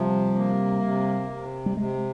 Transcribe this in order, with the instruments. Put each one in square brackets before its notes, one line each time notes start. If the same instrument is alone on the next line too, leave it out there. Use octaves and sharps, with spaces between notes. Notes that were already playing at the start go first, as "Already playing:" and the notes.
Already playing: [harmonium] C3 F3 [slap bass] G3
[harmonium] A#3
C3
C3
[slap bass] G3
[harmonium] C3 [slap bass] G#3